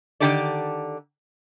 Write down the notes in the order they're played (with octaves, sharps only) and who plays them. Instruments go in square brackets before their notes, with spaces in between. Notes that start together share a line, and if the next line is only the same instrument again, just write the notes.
[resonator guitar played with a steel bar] D3 D#3 E4 G4 A4 D5